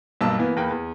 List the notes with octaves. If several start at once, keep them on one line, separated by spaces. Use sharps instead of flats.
B1 G2 A#3 A5 E6
E3 A#3 B3
E2 A#3 B4 G5
E2